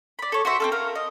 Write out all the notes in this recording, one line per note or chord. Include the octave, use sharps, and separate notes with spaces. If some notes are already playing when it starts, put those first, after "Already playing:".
D5 B5
A4 C#5
F#4 C5 E5
C4 C#4 A4
A#4 F5
D#5